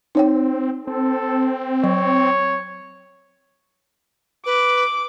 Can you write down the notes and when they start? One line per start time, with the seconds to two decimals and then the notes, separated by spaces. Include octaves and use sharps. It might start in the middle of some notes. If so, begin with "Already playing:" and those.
0.15 C4 D#4 C#5 G5
0.87 C4 A4
1.84 F#3 C#5
4.46 B4 D6